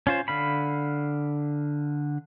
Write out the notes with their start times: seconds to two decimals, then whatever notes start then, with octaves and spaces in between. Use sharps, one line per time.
0.07 C#4 F4 C5
0.28 D3 F5 B5